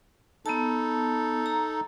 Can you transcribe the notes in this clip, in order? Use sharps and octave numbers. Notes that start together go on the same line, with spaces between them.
B3 D#4 A4 A5
A#5